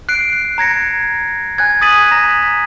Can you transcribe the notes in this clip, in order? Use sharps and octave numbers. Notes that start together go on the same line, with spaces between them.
F#6 C7 D7
A#5 G#6 A#6 C#7
G#5 F#6 G#6
D#6 F#6 A6 B6 D#7 F#7
A#5 A#6 B6